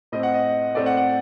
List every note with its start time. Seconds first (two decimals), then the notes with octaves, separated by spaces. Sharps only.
0.12 A2 A3 C4 D#5
0.23 F#5
0.34 D#5
0.75 A2 A3 C4 D5
0.86 F#5
0.97 F#5